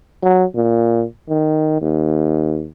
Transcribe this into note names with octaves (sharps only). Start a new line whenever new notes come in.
F#3
A#2
D#3
D#2